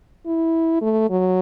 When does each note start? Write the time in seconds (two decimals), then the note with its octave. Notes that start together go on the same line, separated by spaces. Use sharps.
0.26 E4
0.81 A3
1.10 F#3